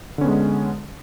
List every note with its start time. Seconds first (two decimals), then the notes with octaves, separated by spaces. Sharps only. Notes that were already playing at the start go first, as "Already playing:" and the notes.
0.18 D3
0.21 C#4
0.24 B3
0.28 G#3